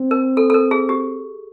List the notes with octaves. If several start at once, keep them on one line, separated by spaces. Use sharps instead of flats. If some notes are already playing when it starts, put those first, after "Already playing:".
Already playing: C4
A#4
A4
A4
A#4
G#4
G4